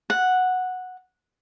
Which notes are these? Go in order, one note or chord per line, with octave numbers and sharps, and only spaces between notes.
F#5